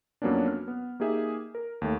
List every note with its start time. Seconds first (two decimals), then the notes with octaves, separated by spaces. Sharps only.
0.22 F2 F#3 A#3 B3 C#4 D4
0.47 F6
0.68 B3
1.00 A#3 D#4 G4 G#4 E5
1.55 A#4
1.82 D#2 A3